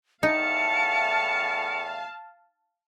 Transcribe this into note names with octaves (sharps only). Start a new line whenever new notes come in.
E2 A2 D#4 F5 A5 C#7